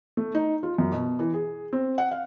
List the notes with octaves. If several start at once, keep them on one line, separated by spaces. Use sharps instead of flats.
A3
D#4
F4
F#2
B2
E3
G#4
C4
F#5
F5